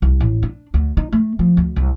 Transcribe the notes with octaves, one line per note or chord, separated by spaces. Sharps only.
C2
A1
D4
D2
D#4
A3
F3
D2
C2